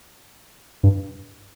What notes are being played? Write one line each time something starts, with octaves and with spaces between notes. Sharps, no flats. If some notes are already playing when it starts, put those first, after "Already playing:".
G2